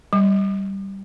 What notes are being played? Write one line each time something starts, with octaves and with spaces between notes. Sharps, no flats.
G3